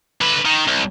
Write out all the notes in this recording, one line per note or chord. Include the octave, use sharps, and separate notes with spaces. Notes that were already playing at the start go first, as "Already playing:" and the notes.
D3 B4
D#3
C2